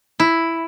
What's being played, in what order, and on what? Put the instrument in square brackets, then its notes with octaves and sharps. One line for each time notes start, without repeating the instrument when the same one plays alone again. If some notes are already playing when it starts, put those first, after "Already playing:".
[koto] E4